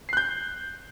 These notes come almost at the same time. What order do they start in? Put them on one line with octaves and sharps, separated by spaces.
C7 F#6 G6